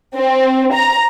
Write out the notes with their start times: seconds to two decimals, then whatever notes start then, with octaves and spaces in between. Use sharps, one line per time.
0.14 C4
0.72 A#5